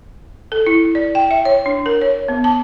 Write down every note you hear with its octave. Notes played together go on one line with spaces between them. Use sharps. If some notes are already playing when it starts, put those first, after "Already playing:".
A4
E4
D5
G5
E5
C#5
D4
A#4
C#5
B3
A5